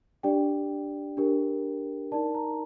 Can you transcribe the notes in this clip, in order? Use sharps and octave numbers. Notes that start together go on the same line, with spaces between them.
D4 G4 D5 G5
D4 G4 A#4
D#4 A#4 D5 A5
A#5